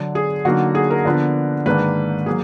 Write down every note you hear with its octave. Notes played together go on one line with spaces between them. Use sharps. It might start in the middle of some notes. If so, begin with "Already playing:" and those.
Already playing: D3 F#3 D4
G#4
D3 F#3 A#3 D#4 F#4
G#4
A#4
D3 F3 B3 D4
G#2 D#3 A#3 D4 B4
F#3 A#3 G#4